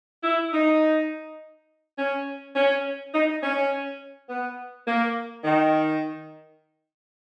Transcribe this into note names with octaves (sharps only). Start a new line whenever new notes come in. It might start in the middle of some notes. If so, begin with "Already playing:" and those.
E4
D#4
C#4
C#4
D#4
C#4
B3
A#3
D#3